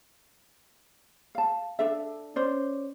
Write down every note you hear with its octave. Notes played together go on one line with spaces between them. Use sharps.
F5 A5
D4 A4 E5
C#4 C5 D5